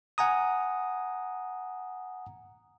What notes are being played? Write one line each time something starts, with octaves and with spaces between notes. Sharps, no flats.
F#5 G#5 A#5 D#6